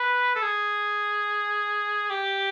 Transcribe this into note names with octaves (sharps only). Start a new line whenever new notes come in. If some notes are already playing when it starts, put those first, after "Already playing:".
Already playing: B4
A4
G#4
G4